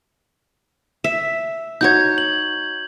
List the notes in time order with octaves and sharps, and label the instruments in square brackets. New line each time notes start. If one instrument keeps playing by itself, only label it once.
[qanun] E5
[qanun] D#4 F#4 C#5 [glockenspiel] G6 G#6
[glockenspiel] F#7